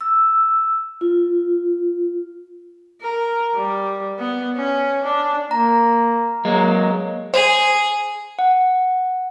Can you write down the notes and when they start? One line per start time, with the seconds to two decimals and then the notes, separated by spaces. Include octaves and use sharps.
0.01 E6
1.01 F4
3.01 A#4
3.56 G3
4.19 B3
4.56 C#4
5.04 D4
5.51 A#3 A#5
6.45 F#3 G#3 A#3
7.34 G#4 C5
8.39 F#5